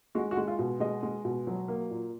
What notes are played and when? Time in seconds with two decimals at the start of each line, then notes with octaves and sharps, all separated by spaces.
0.15 G#3 F#4
0.31 F#4
0.37 G#3
0.48 F4
0.59 B2
0.80 G#3 D#5
1.03 G#3
1.25 B2
1.47 F#3
1.68 A#3
1.91 A#2